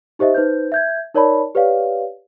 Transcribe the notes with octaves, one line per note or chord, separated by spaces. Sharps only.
D#4 G4 C5 D#5 E5
D#4 B4 C5 G6
E5 G6 G#6
D#4 A#4 C#5 D5 A5 B5
G4 B4 C#5 D5 F5